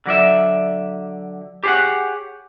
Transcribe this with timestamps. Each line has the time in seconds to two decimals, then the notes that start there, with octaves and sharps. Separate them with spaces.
0.06 D3 F#3 D5 E5
1.64 G4 G#4 C5 C#5 F#5